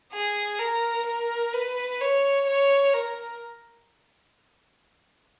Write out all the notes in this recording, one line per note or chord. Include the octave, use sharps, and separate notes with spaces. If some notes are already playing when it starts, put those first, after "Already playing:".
G#4
A#4
A#4
B4
C#5
C#5
A#4